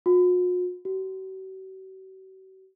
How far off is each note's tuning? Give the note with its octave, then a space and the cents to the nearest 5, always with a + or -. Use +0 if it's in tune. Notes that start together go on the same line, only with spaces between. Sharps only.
F#4 -45
F#4 +45